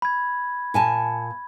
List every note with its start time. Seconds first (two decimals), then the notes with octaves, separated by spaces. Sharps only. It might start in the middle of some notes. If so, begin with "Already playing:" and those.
0.02 B5 G#6
0.74 A#2 G#5 A5